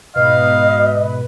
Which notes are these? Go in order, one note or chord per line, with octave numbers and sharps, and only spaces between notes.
G#2 B2 B4 D#5 F5